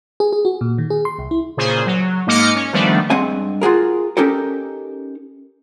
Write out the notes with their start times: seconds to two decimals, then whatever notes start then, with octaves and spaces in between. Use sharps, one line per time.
0.20 G#4
0.32 G#4
0.45 F#4
0.61 A#2
0.78 D#3
0.90 G#4
1.05 C6
1.19 C2
1.31 E4
1.57 A#2 C#3 G#4 C5
1.86 F#3
2.27 G#2 A#3 D#5 D6 F6 C#7
2.55 C#4
2.73 D#3 F3 G3 A3 B3 D4
3.10 G2 G#3 C4 F#5 G#5
3.61 F4 F#4 G#4 A#4
4.17 C#4 D#4 G4 A4 A#4